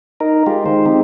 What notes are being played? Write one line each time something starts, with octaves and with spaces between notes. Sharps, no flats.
D#4 A#4
G#3 F4 G4
D#3 G#3 C5
C4 D#4 G4